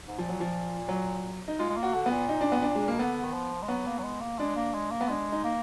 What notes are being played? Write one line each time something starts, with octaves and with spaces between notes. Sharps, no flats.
G#2
A#2 F3
F#3
F3
F#3
D#4
G#3 F4
G#3
A#3
F#4
D3
B3
A#2
D#4
D4
B3
D4
G#3
B2 A#3
D3 B3
D#3
F3
G#3
F#3 B3
A#3
F#3
G#3
A#3
G#3 D4
A#3
G#3
A#3
B3
G#3 D4
D#4
A#3